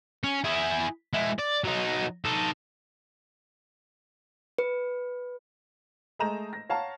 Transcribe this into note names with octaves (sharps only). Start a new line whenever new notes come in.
C#4
E4 G#4
G#3 E4
D5
F#3 D#4
D#4 A4
B4
G#3 A3 D#5 A#5 G6 E7
A#6
C#5 F5 F#5 A5 A#5